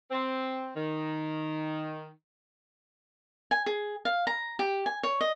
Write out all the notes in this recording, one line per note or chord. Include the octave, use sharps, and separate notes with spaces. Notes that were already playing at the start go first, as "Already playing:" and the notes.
C4
D#3
G#5
G#4
F5
A#5
G4
G#5
C#5
D#5